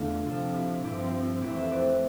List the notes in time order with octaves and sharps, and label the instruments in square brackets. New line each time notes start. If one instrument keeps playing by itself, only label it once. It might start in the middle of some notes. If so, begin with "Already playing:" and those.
Already playing: [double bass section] E2 D3 A3 [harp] D4 F4
[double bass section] C3 F3 C4 [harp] F4 A4
[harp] E4
[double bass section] G2 F3 C4 [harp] E4 G4
[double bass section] F2 E3 A3 C4 [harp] E4 G4
[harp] C5 E5
B4 D5